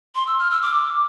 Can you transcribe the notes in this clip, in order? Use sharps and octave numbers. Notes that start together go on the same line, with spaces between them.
C6
E6
F6
E6
D6